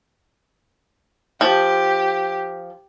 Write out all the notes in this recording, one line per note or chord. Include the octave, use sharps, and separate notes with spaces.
F3 G4